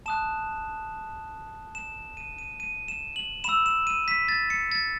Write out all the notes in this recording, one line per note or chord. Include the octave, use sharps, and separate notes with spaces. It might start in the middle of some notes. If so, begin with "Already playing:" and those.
A5 D#6 F#6 E7
E7
D#7
D#7
D#7
E7
F#7
B5 E6 E7
E7
D#7
B6
A6
C#7
A6